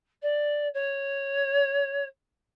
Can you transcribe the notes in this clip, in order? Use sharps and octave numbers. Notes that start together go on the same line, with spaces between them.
D5
C#5